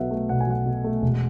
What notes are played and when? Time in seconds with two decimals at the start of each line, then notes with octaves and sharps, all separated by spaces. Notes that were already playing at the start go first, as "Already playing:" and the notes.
Already playing: B1 B2 F#3 A4 B4 E5 F#5
0.11 A3
0.29 B1 F#5
0.41 G#5
0.47 F#3 F#5
0.66 B2
0.84 A3
1.02 E1